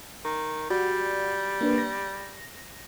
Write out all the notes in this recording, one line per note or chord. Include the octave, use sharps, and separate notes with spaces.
D#3
G3 F#4 D5
A#3 D4 B4
A#6